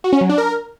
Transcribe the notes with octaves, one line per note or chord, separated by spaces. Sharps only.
F#4
C#4
F#3
D4
A#4